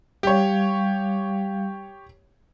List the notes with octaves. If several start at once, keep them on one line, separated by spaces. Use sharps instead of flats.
G3 G4 C#5 F5